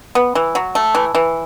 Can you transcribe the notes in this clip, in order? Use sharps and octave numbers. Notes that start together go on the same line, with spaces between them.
B3
E3
F#3
A3
E3
E3